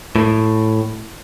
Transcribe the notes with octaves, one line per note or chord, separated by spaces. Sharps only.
A2